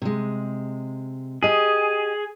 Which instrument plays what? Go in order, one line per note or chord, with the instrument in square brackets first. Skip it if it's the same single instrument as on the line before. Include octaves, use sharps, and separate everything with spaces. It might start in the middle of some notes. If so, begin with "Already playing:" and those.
[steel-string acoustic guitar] C3 G#3
[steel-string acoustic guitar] G4 D#5 [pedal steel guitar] G#4